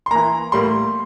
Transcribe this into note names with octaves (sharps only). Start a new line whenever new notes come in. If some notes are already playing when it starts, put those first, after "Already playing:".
C6
E3 A#3 A#5
A2 G3 A#3 C6